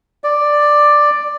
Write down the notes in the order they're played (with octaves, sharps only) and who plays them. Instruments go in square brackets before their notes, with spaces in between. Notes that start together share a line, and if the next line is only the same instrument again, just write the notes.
[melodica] D5